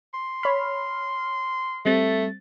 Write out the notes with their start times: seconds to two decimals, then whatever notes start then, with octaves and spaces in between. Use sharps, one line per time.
0.14 C6
0.43 C#5 B5 F6
1.85 G3 A3 C4 A6